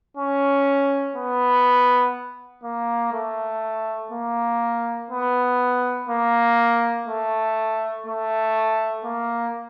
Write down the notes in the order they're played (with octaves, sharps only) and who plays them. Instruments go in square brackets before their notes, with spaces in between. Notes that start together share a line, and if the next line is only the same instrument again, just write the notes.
[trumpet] C#4
B3
A#3
A3
A#3
B3
A#3
A3
A3
A#3